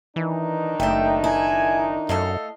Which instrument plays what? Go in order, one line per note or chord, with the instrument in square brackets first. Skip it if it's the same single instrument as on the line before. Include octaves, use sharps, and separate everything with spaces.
[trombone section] D#3 D4 D#4 [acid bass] E3
[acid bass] F#1 [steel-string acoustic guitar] A3 E5 [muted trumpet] G5
[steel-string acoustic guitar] E4 [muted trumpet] G#5
[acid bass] F#2 [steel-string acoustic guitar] A3 D#5 F5 [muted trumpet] A4